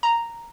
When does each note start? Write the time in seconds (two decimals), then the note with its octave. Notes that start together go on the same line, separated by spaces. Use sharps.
0.03 A#5